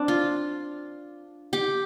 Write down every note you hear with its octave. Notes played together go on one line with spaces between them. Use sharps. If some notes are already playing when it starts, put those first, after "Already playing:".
Already playing: C4 D4
F4
G4